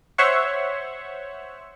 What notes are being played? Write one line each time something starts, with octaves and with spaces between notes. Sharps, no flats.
C5 C#5 E5 F#5 C#6